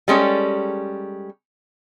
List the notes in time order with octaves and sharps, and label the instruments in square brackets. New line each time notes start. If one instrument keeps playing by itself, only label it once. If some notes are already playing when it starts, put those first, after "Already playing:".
[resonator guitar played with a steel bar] G3 G#3 C#4 A4